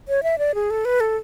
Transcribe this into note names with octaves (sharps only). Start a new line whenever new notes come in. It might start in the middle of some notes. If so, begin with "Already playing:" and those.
C#5
E5
D5
G#4
A4
B4
A4